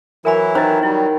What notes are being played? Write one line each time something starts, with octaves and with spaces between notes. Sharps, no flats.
E3 F#3 E4 A#4 G#5 B5
D#3 C5 D#5
F#3 G3 E4